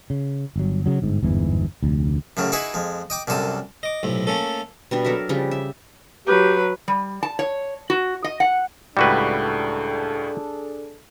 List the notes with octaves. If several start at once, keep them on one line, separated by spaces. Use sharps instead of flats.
C#3
G1 F#3
C#3 F#3
G1 G#2
G1 E2 G#2 E3
F1 D2
F#2 A2 C#3 F#3
D#4 E4 F#4 G#4 B4 D#5
F2 G#3
D#5 G5 D6
C2 F#2 C3 A4 D#6
D#5 D6
B1 A2 C3
A3 A#3 C#4 A4
B2 G3 D4
F#3 A4 A#4 E5
C#3 F3 G3 G4
E5
F#3 G4 B4
G3
A5
C#5
F#4
D#5
F#5
C#2 A2 G3 D4 F#4 G#4 A4 B4